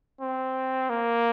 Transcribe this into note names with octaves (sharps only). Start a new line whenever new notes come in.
C4
A#3